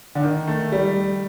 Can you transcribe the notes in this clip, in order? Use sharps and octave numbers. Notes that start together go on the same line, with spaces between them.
D3
D#3
A3
G3